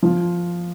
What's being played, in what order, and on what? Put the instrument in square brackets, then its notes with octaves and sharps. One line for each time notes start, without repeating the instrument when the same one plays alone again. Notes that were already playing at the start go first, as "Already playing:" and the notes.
[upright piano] F3 F4